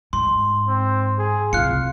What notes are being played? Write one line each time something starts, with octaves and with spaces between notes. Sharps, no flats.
G#2 C6
C4
G#4
C2 F4 F5 F#6 C#7